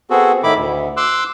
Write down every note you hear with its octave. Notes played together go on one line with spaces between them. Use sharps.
B3 C4 F#4 G#4 A4
A2 D#3 E4 B5 D6
D2
C6 D6 E6 F#6